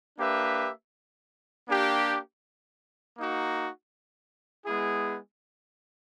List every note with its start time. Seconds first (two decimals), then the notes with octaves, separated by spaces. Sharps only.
0.18 A#3 D4 G4 B4 E5
1.67 A#3 D4 G4
3.17 A#3 D#4 F#4
4.65 G#3 B3 E4 G#4